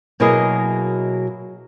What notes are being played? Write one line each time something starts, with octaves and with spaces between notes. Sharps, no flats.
B2 F#3 A#3 E4 G#4 D#5